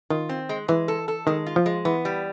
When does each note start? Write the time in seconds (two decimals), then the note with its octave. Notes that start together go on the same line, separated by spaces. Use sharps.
0.10 D#3 F4
0.29 C4
0.49 G#3
0.68 E3 G#3
0.88 A4
1.08 A4
1.27 D#3 G#3
1.46 F4
1.56 F3
1.66 G#3
1.85 E3 B3
2.05 G3